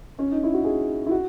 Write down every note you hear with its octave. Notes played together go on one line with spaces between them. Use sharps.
C#4
D#4
E4
F#4
G#4
E4
F#4